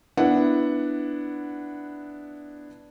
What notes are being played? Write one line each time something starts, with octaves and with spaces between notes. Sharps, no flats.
B3 D4 E4 F#5